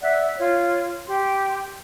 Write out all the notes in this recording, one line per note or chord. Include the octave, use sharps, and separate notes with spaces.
D5 E5 F#5
F4 C#5
G4 C6